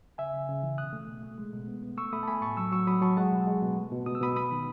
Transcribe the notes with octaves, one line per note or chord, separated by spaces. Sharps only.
C#3 E5 G#5
C#3
C#3
E3
B2 D#6 F#6
A3
B2
A3
G#3
B2
B3
B3
A3 C#6 E6
A3 B5 D#6
A5
A3 G#5 B5
A2 A5 C#6
F#3 C#6 E6
F#3 C#6 E6
F#3 B5 D#6
F#3 A5 C#6
G#3 F#5 A5
B2
G#3
B2
A3
B2
B2 D#6
E6
B2 B5 D#6
B3 B5 D#6
D#3